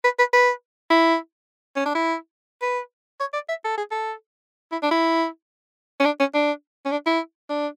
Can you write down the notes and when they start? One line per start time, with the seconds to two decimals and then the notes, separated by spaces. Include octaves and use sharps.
0.04 B4
0.19 B4
0.33 B4
0.90 E4
1.76 C#4
1.86 D4
1.95 E4
2.62 B4
3.20 C#5
3.33 D5
3.49 E5
3.65 A4
3.77 G#4
3.91 A4
4.72 E4
4.83 D4
4.91 E4
6.00 C#4
6.05 D4
6.20 C#4
6.34 D4
6.85 C#4
6.91 D4
7.06 E4
7.50 D4